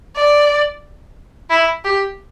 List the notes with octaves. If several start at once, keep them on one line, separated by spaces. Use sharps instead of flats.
D5
E4
G4